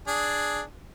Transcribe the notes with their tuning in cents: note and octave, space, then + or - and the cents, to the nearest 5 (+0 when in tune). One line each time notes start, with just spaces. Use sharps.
D4 +0 G#4 +0